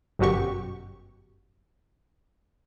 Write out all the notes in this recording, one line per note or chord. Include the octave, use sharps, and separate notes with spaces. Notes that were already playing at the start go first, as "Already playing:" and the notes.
G1 F#2 B2 F#4 G4 C#6